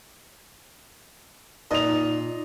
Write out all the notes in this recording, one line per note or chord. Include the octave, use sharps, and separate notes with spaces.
A#2 D#4 D#5 F7